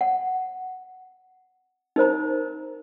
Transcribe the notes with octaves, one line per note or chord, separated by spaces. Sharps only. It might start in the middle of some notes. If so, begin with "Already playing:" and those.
F#5
D#4 A#4 C5 A#5